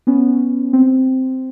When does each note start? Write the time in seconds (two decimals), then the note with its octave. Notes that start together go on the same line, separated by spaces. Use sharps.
0.07 B3 C#4
0.73 C4